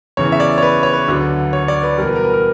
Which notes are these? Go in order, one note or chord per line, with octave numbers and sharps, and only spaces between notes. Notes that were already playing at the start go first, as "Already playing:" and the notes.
E2 C#3 E3 C#5
E5
D5
C#5
B4
C#5
B4
D2 D3 F#3
C#5
D5
B4
E2 B2 G3 A#4
B4
A#4
B4
A#4